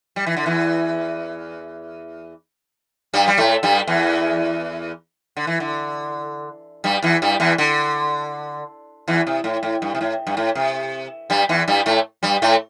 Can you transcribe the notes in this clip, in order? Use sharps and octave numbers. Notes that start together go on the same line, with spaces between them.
G3
E3
D3
E2 E3
G2 G3
G3
A2 A3
G2 G3
E2 E3
D3
E3
D3
G2 G3
E2 E3
G2 G3
E2 E3
D3
E2 E3
C3
A2
A2
G2
C3
A2
G2
A2
C3
G2 G3
E2 E3
G2 G3
A2 A3
G2 G3
A2 A3